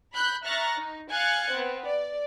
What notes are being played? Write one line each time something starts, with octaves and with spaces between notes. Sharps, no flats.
B5 F#6 G6
E5 A#5 C#6 F6 F#6 A6
D#4
F5 G#5 F#6 G#6 A6 C#7
B3 C4
D5